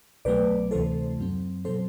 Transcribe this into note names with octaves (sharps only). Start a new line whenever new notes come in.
C2 B2 F#3 A3 B4 D5
D2 C3 E3 A3 A4 C5
F#2 F#3 C4
B2 F#3 C4 A4 C5